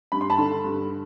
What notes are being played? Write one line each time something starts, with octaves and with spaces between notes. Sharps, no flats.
G2 B5
C6
A5 B5
D3
G2